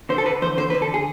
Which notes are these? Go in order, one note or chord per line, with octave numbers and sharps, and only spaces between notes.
D3 C5
A4
D3 B4
E2 C5
D3 C5
B4
D3
A4
G#4